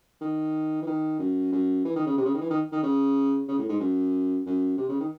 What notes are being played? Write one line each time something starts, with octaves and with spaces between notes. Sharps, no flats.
D#3
E3
D#3
F#2
F#2
E3
D#3
C#3
C3
C#3
D#3
E3
D#3
D#3
C#3
C#3
A2
G#2
F#2
F#2
C3
C#3
D#3